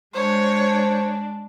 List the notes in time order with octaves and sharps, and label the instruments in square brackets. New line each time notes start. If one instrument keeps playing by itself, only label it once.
[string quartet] G#3 D4 [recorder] C5 [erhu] C#5